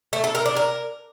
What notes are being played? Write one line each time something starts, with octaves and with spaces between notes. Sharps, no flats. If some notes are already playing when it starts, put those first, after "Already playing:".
A3
A4
A#4
D4
A#4